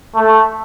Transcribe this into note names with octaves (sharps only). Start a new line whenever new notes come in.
A3